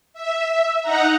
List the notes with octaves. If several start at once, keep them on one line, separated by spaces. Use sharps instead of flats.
E5
D#4 F#5 A#5